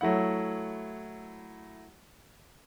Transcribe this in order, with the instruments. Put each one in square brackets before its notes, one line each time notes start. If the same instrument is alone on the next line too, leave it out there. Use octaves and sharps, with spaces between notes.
[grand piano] F#3 A3 E4 F#5